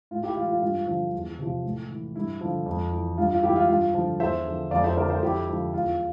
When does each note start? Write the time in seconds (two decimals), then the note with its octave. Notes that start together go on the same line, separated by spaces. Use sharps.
0.11 A2 F4
0.23 E4 G4
0.36 E3 F4
0.49 F4
0.62 G2 F4
0.88 D3 F3
1.13 E2
1.39 C3 F3
1.64 A2
1.90 E3
2.15 G2 E4
2.41 D3 F3
2.66 F2
2.92 E3
3.18 G2 F4
3.30 F4
3.43 E3 E4 G4
3.56 F4
3.68 G2 F4
3.94 D3 F3
4.20 E2 C5 E5
4.46 D3 F3
4.71 F2 D5 F5
4.84 C5 E5
4.97 D3 F3 A#4 D5
5.10 A4 C5
5.22 F2 E4 G4
5.47 D3 F3
5.73 E2 F4